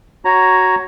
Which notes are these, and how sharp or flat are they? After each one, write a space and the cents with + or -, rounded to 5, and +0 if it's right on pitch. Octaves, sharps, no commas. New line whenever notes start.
F#4 +5 C#5 +0 A#5 +0